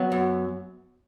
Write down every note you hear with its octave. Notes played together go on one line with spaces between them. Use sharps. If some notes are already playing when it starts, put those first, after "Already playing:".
Already playing: F#3 B3
F#2